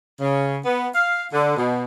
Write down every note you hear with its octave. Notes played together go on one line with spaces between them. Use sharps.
C#3
B3
F5
D3
B2